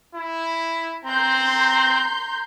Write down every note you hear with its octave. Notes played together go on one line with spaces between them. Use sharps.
E4
C4 A#5 C6 G6